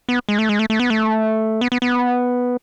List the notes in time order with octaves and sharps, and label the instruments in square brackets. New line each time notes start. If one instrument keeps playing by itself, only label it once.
[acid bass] B3
G#3
A3
G#3
A3
A3
B3
A3
B3
B3
B3